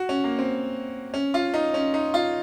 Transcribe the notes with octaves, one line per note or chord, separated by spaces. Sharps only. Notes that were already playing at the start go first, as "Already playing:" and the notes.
Already playing: F#4
C#4
A#3
C4
C#4
F4
D#4
C#4
D#4
F4